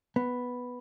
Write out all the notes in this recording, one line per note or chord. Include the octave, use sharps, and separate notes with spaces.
B3